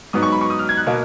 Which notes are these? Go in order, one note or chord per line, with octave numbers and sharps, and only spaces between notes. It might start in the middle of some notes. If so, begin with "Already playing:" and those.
G#2 F#3 B3 D#6
C#6
B5
C#6
D#6
F6
G#6
F#6
B2 A#3